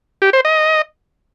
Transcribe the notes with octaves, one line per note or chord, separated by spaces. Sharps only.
G4
C5
D#5